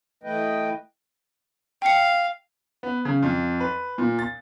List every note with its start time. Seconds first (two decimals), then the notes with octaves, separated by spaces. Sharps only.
0.23 E3 A3 B4 D#5 G5
1.82 F5 G5 C#7
2.83 B3
3.05 C#3
3.22 F2
3.60 B4
3.98 A#2
4.19 A6